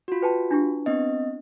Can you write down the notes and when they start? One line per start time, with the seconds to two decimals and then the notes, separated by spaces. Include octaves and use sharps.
0.08 F4 F#4
0.22 B4 G5 A5
0.51 D4 E4 G4
0.86 B3 C4 D#5